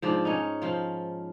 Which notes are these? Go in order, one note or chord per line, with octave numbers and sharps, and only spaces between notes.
G#2 F3 D4 D5
C#4 D#4
F3 F4